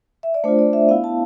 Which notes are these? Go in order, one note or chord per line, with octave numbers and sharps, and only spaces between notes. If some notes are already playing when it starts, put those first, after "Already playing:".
E5
D5
A3 D4 F4 C5
D5
E5
B3 E4 F5
A5